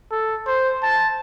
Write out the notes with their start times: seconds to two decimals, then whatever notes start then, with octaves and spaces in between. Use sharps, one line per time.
0.11 A4
0.47 C5
0.83 A5